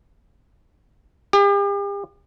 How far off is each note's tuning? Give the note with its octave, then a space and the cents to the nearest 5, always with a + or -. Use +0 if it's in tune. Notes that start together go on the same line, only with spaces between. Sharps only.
G4 +40